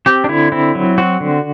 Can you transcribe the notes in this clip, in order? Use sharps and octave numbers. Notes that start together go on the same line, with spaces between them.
C4 G4
D4
D3 E4
C4 E4
F#3
C4 F#4
D3